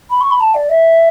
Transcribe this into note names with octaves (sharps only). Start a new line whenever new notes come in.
B5
C#6
B5
A5
D5
E5